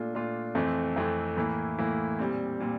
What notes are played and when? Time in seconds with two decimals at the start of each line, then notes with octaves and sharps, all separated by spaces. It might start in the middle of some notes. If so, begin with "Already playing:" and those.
Already playing: A#2 A3 D4 F4
0.14 A#2 A3 D4 F4
0.55 F2 E3 A3 C4
0.96 F2 E3 A3 C4
1.37 A2 E3 A#3 E4
1.78 A2 E3 A#3 E4
2.19 A#2 G3 C4
2.60 A#2 G3 C4